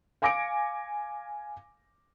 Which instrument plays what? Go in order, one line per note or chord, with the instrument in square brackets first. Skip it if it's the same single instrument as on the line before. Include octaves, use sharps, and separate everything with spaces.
[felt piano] F5 G#5 D6 A#6 C#7 D7